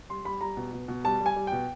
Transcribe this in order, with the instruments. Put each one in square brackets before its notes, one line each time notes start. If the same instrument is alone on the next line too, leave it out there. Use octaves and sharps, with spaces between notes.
[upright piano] G3 C6
G3 B5
G3 A#5
B2
B2
B2
G3 A5
G3
G#5
G3
B2 G5